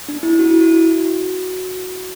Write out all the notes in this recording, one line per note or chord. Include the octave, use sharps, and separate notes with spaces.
D4
E4
F#4
E4
F#4